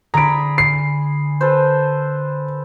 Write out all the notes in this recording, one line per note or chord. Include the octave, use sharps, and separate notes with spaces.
D3 G#4 A#5 B5 D7
C7
A4 B4 C5